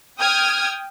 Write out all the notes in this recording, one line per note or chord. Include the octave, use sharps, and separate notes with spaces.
G5 D#6 F6 G#6